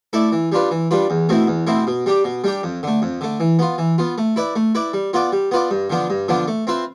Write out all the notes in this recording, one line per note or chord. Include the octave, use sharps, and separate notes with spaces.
A3 E4 A4 D5
E3
G3 D4 F4 B4
E3
G3 D4 F4 B4
E2
B2 A3 C4 E4
E2
B2 A3 C4 E4
B2
G3 D4 G4
B2
G3 D4 G4
F2
D3 A3
F2
D3 A3
E3
B3 F4
E3
B3 F4
A3
E4 B4 D5
A3
E4 B4 D5
G3
B3 F4 B4 D5
G3
B3 F4 B4 D5
G2
D3 F3 B3 D4
G2
D3 F3 B3 D4
A3
C4 F4 B4 E5